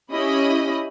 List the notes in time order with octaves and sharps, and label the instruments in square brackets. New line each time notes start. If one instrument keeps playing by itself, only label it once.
[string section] C#4 E4 G4 D#5 B5 D#6